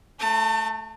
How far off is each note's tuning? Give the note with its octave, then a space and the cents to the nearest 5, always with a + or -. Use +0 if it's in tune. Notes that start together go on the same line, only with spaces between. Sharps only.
A3 -10 A5 +40